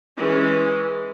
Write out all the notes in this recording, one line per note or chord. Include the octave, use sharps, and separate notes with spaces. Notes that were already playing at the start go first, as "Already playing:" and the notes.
E3 G#3 C#4